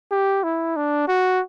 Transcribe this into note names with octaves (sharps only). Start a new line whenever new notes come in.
G4
E4
D4
F#4